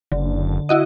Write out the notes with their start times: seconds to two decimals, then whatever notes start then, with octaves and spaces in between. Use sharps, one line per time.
0.12 F#1 D3
0.69 E4 F#4 D#5